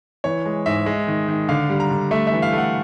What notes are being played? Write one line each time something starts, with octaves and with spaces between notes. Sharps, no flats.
E3 C#5
G#3
G#2 E5
G#3
D#3
D#3
D3 F5
G3
A#5
D3
A3 E5
E5
E3
F5
A3
F#5